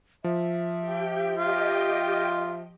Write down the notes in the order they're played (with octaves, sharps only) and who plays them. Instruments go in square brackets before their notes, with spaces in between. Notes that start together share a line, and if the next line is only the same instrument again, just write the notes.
[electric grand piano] F3 [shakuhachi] E5
[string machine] G4 G5
[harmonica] F4 [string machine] G4 D#5 G5